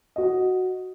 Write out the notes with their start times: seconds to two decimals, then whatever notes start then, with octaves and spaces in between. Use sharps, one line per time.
0.16 F#4 D#5